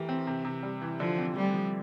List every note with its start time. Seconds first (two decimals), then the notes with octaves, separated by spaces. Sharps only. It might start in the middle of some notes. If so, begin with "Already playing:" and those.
Already playing: E3 A3 G4 A#4
0.09 C4
0.27 C3
0.45 C3
0.63 G3
0.82 E3
1.00 D3 F3
1.18 C4
1.36 G3 A3
1.54 F3